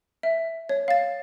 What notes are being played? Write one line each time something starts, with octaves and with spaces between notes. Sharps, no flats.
E5
C#5
F5 A6